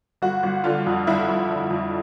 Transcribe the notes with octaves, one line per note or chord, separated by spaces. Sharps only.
G1 F#4
G1
D3 F4
F2
G1 E4
G1
D3
F2